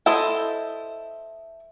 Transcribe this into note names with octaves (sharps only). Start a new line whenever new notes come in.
E4 A4 C5 D#5